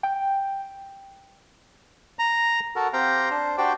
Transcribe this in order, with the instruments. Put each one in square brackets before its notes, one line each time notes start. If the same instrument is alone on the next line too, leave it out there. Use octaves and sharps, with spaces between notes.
[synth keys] G5
[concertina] A#5
F#4 A4 A#4
C4 G4 F5 G5 A#5
D4 C5
D4 F#4 G4 C5 D5 G5